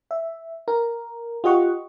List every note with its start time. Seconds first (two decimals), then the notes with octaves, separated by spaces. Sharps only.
0.11 E5
0.68 A#4
1.44 F4 G4 D#5 F#5 C#6